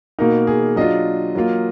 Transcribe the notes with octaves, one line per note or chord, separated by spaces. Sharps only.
B2 A#3 D#4 A#4
G#4
F#3 D4 F4 D#5
F#3 A#3 F4